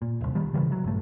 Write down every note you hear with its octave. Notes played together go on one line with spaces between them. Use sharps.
A#2
D#1 C2
D1 D#3 G3
C#3 E3 G3
F#3
A#1 G2 A3